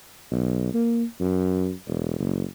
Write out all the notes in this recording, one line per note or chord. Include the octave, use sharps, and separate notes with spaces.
B1
A#3
F#2
E1
F#1